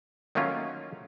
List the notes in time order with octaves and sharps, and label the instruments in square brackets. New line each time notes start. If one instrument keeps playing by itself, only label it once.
[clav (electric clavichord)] D#3 F#3 A3 A#3 C#4 F4